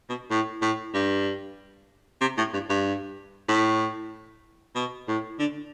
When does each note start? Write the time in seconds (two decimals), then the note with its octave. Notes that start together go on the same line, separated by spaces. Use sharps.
0.09 B2
0.30 A2
0.62 A2
0.94 G2
2.21 C3
2.38 A2
2.53 G2
2.69 G2
3.48 A2
4.75 B2
5.08 A2
5.39 D3